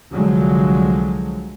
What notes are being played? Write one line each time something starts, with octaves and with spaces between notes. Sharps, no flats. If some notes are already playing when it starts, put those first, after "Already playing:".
C2 D3 F3 F#3 G#3